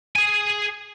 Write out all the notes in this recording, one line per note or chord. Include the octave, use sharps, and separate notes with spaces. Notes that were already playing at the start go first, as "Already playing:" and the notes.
G#4 G#5